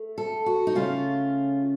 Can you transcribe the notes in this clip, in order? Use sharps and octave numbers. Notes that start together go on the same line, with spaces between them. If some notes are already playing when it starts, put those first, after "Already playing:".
Already playing: A3
A4
F#4
D#4
C#3 A3 C#4 F4